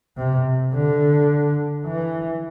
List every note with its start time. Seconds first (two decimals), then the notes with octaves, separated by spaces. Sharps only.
0.17 C3
0.73 D3
1.85 E3